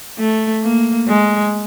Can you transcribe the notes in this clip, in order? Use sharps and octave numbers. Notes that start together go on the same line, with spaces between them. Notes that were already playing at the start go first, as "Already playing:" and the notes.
A3
A#3
G#3